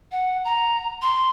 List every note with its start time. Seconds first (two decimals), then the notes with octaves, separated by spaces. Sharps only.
0.11 F#5
0.44 A#5
1.02 C6